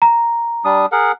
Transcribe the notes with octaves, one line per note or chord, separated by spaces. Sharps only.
A#5
G3 D4 D#6
G#4 A#4 F#5